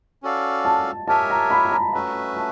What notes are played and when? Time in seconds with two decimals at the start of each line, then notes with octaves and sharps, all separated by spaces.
0.23 C#4 F#4 A4 D5 F5
0.65 A5
1.08 G4 A#4 C#5 E5 G#5 A5
1.30 A#5
1.51 B5
1.65 B5
1.72 A#5
1.93 A3 C#4 F#4 B4 E5 A#5
2.37 A5